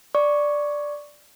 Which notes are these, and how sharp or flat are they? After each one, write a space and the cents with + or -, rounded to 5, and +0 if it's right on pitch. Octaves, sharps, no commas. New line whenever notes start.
D5 +0 C#6 +0